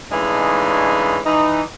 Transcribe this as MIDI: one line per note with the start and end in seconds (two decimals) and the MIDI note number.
0.11 1.19 45
0.11 1.19 49
0.11 1.19 52
0.11 1.19 56
0.11 1.19 62
0.11 1.19 63
1.25 1.61 52
1.25 1.61 63